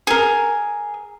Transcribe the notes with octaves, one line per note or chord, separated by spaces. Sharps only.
G#4 A#4